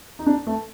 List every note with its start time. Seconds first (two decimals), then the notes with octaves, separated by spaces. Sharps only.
0.19 D#4
0.26 D4
0.47 A3